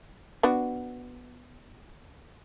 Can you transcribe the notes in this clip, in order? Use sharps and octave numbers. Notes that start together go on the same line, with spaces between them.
B3 D4 F#4